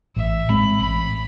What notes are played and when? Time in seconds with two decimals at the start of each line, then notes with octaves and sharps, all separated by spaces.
0.16 A1 E5
0.49 A2 G#3 C4 B5
0.80 A1 B5